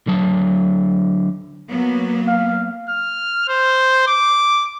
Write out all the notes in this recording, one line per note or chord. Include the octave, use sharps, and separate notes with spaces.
D3 F#3 A5
F#3 A#3 B3
F5
F6
C5
D6